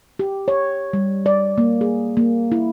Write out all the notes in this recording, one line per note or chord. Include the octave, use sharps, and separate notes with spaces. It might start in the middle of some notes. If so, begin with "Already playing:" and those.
G4
C#5
G3
D5
A#3
G#4
A#3
E4